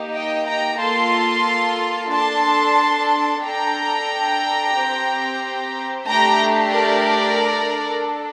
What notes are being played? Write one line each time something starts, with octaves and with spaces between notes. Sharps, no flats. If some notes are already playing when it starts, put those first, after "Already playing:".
Already playing: A#3 D#4 G4
D#5 G5
G5 A#5
A#3 F4 A4 A5 C6
D4 A4 A5 C6
D4 A4 G5 A#5
C4 G4
A3 D4 G4 G5 A#5
A#4 D5
D4 A4